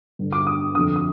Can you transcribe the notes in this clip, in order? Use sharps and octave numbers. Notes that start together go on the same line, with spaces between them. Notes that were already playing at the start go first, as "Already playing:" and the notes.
G2 D3
D6
D#6
F2 D3 D#6
D#6